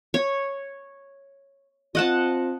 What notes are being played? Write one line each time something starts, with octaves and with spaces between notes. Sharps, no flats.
C#5
C4 F4 D#5 F#5 A5